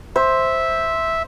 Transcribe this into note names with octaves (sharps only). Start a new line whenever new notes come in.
C5 E5